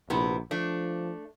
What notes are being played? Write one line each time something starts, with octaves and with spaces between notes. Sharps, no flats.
A#1 C3 B3 E4
F3 A3 D4